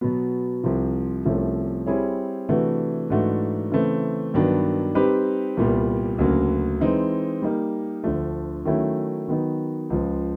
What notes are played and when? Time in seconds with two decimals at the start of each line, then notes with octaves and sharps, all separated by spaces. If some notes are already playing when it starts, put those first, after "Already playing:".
0.01 B2 F#3 B3
0.64 C2 C3 F3
1.25 C2 C3 F3 A3 C#4
1.87 G3 C4 E4 G#4 C#5
2.49 C3 E3 A3 D4 F#4
3.10 G#2 E3 A3 D4 F#4
3.72 C#3 E3 A3 C4
4.34 G2 D#3 F#3 B3 D4
4.95 G3 C4 D#4 G4 B4
5.57 C2 A#2 G3 B3
6.18 D2 C#3 F#3 A#3
6.80 E3 G#3 C4 D#4
7.42 G3 A#3 D#4
8.04 D2 D3 F3 A3
8.65 D#3 F#3 A3 C#4 E4
9.28 D#3 F#3 B3 D#4
9.90 C#2 C#3 F3